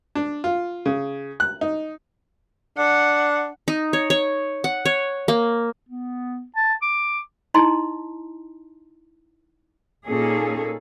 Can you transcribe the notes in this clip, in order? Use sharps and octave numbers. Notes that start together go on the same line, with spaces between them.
D4
F4
C#3
F#6
D#4
D4 F#5
D#4
C#5
C#5
F#5
C#5
A#3
B3
A5
D6
D#4 E4 D#5 A5 A#5 C6
A#2 A#3 C#4 D#4 G#4 A4